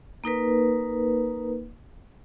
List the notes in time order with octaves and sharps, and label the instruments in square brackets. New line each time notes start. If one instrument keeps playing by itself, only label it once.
[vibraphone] A#3 D#4 A#4 B4